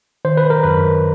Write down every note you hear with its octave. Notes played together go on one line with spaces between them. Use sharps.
D#3 C5
B4
A#4
F#2 B4